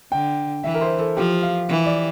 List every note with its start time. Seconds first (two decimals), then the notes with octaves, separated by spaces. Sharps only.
0.12 D3 G5
0.64 E3 E5
0.74 A#4
0.81 C5
0.99 A4
1.17 F3 G4
1.43 F5
1.69 E3
1.86 D5